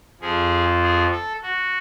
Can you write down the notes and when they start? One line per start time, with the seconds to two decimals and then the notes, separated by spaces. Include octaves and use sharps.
0.21 F2 F3 G#4
0.82 G#4
1.12 A4
1.42 F#4